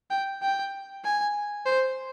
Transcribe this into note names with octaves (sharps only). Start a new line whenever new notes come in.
G5
G5
G#5
C5